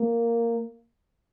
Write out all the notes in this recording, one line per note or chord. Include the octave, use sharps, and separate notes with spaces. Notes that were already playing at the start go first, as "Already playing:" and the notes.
Already playing: A#3